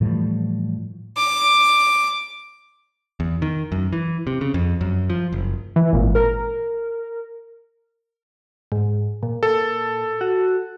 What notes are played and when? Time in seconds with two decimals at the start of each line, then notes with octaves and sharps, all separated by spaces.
0.01 A2 E3 F3 G3
1.17 D6
3.20 E2
3.42 D#3
3.72 F#2
3.93 E3
4.27 C3
4.41 C#3
4.54 F2
4.81 F#2
5.10 F3
5.33 F#1
5.76 E3
5.93 G#1 A#2
6.15 A#4
8.72 G#2
9.23 A#2
9.43 A#2 A4
10.21 F#4